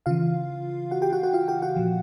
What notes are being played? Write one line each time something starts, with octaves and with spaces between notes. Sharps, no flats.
C#3 E3 F4 F5
F#4 F#5
G4 G5
F#4 F#5
F#4 F#5
F4 F5
G4 G5
F#4 F#5
A#2 F3